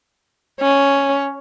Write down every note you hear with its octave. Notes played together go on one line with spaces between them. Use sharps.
C#4